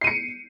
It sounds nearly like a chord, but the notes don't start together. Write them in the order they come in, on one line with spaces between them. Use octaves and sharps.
C7 D#7 C#7